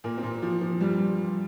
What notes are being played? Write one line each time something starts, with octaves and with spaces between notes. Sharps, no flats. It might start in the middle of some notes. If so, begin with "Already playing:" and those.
A#2 A#3
C4
A#2 A#3
F3
F3
G2 G3